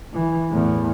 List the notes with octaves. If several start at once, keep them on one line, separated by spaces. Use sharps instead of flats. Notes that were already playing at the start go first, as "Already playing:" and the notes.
E3
E2 A2